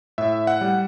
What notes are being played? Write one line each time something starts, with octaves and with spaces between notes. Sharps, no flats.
A2 E5
F#5
G3